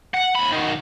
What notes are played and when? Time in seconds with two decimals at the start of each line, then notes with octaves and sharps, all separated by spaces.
0.14 F#5
0.36 D#2 B5
0.52 D#3 F#3